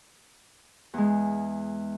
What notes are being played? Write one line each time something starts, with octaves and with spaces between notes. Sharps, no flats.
E2 G#3